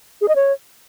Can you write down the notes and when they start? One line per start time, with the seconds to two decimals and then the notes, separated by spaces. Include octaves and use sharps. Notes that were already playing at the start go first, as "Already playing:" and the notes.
0.21 G#4
0.28 D#5
0.35 C#5